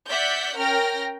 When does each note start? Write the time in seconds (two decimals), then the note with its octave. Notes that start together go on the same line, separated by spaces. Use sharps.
0.10 D5 E5 F#5 G6 B6
0.57 C#4 A#4 G5 F6 A#6